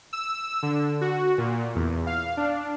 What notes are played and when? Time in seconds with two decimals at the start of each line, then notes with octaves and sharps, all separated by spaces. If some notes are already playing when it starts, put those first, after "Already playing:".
0.13 E6
0.63 D3
1.01 F#4
1.38 A#2
1.76 E2
2.06 F5
2.37 D4